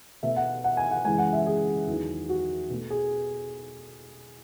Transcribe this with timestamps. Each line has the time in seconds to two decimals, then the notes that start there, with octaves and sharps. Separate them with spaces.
0.23 B2 A3 E5
0.36 F#5
0.64 F#5
0.77 G#5
0.91 F#5
1.05 F#2 C#3 E3 G#3 G#5
1.18 F#5
1.33 E5
1.47 G#4
1.87 E2 D#3 F#3 B3
2.29 F#4
2.70 B2 A3
2.90 G#4